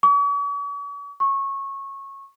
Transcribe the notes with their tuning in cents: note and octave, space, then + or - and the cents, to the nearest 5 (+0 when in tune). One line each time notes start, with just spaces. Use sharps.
C#6 +45
C#6 -20